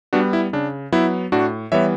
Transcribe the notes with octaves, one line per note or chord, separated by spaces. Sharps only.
G3 B3 D4 F#4
E4
C#3 D4
F#3 B3 E4
A2 D4 F#4
E3 G3 B3 C#5 E5